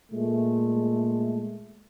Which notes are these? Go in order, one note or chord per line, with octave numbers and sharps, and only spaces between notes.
A#2 G#3 A3